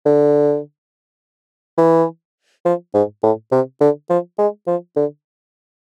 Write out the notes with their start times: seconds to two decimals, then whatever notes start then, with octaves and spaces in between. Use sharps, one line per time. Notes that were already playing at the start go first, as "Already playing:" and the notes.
0.06 D3
1.78 E3
2.65 F3
2.94 G#2
3.23 A2
3.52 C3
3.81 D3
4.09 F3
4.38 G#3
4.67 F3
4.96 D3